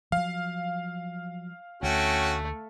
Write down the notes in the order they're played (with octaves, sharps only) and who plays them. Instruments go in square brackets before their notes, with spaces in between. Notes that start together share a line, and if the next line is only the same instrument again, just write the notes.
[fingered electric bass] F3 F#3 [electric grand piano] F5
[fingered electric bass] D2 [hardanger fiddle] A3 [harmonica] C#4 F#4 G5